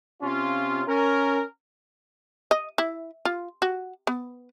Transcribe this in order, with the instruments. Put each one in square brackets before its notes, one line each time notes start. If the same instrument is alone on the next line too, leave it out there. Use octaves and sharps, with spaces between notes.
[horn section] C3 C#4 F4
C#4 A#4
[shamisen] D#5
E4
F4
F#4
B3